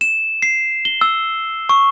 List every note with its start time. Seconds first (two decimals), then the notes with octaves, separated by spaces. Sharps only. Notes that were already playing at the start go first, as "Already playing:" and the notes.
0.01 E7
0.42 C7
0.85 G7
1.01 E6
1.69 C#6